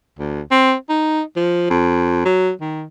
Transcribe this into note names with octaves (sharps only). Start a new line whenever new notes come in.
D2
C4
D#4
F3
F2
F#3
D#3